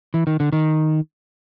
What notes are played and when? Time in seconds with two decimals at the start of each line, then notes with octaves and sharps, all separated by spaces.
0.14 E3
0.27 D#3
0.40 D3
0.53 D#3